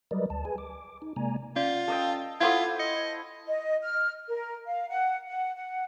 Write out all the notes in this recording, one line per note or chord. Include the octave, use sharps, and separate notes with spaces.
F#3 G3 A#4 B4 D5 D#5
D2 A5
G#4 B4 G#5
D6
D#4
C3 G#3 A#3 D5 G#5 A#5
C#4 F4 D5
A4 D#5 G5
E4 F4 A4 C5 F#5 D#6 G#6
D#5 C#7
D#5
F6
A#4
F5
F#5
F#5
F#5